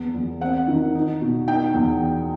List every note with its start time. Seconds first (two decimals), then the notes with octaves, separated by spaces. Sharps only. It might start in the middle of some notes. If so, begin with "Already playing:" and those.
Already playing: E2 B3
0.14 E2
0.41 C4 F#5
0.68 D#3
0.95 D#4
1.21 B2
1.48 D#4 G5
1.74 E2